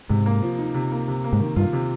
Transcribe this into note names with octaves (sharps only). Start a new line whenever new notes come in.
G#2 C3
A#3
F3
D#4
C3
A#3
C3
A#3
G#2
D#3
G2 F4
C3